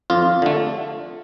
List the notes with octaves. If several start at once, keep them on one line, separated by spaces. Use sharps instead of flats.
F2 F4
D3 A3